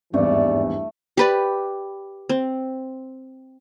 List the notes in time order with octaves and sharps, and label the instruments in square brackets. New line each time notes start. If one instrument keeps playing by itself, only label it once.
[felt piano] G#1 E2 [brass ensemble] G2 E3 [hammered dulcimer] A3 [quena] D5
[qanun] G4 B4 D5
C4